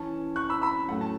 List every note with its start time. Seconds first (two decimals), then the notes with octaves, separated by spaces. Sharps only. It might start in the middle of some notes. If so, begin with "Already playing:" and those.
Already playing: E3 C#4 A5
0.36 C#6 F#6
0.50 B5 E6
0.62 B5 E6
0.88 A2 F#3 A3 C#4 F#5
1.01 A5